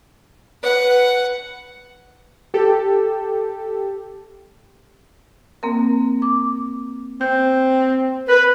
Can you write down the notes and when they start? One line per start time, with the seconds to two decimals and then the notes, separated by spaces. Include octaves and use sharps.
0.64 B4 F#5
2.54 G4 A4
5.63 A#3 C4 A#4
6.22 D6
7.21 C4 G6
8.28 A#4 B4